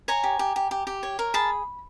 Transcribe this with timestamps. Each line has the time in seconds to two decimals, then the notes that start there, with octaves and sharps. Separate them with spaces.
0.08 C#5 G#5 A#5
0.24 G4
0.39 G4
0.56 G4
0.71 G4
0.87 G4
1.03 C#5
1.19 A#4
1.34 G#4 A5 B5